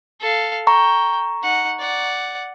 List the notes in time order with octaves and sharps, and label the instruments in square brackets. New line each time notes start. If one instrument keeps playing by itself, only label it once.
[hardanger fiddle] A4 F5
[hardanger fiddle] G5 [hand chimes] A#5 C#6
[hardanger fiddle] D#4 F#5
D5 F#5